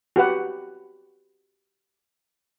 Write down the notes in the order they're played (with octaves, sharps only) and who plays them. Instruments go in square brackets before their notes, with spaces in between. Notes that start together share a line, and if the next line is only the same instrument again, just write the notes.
[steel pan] F#4 G4 B4 F#5